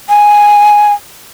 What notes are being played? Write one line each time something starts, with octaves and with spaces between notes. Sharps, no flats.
G#5